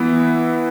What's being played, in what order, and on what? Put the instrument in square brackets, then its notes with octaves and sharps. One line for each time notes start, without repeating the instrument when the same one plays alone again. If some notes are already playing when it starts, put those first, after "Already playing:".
Already playing: [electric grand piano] E3 B3 E4